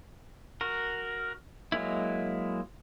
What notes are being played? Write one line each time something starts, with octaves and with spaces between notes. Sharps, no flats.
F#4 A#4
F#3 G#3 A#3 E4